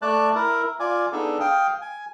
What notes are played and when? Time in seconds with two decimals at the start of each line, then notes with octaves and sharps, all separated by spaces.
0.02 A3 D5 A5 F#6
0.35 E4 A#4
0.80 F4 D5 G#5
1.12 B3 D4 D#4 G#4 A4
1.40 F5 G5 D#6
1.81 G#5